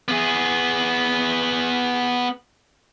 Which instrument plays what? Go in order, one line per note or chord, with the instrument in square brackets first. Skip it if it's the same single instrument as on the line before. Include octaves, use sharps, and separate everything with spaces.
[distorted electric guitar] B3 G#4